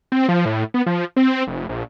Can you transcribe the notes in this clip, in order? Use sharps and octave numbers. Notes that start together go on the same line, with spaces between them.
C4
F3
A2
B3
F3
C4
F1
A#1